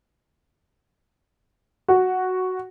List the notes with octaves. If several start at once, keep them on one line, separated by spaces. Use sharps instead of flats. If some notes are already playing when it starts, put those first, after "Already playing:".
F#4